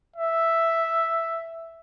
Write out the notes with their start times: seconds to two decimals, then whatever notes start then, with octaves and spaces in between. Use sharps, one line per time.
0.16 E5